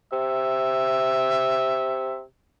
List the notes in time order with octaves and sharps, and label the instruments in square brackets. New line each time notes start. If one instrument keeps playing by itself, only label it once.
[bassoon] C3 [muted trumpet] E5